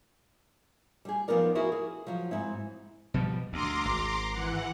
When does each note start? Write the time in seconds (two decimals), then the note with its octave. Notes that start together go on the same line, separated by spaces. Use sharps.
1.05 G3 G#4
1.28 F2 F3 B3 D#4 A#4 D5
1.55 E4 F#4 G#4 A#4
1.72 G#4
2.07 F3 F#3
2.31 G#2 C4 E4
3.14 B2 F3 G3
3.53 D2 A#5 C6 D6
3.85 G#1
4.32 E3 F#5